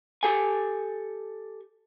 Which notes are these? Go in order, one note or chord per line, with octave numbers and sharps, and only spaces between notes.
G4 A4 G#5